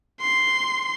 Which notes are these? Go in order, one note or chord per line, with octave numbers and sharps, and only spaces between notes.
C6